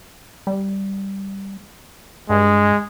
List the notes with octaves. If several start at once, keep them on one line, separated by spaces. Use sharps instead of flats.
G3
G2 G#3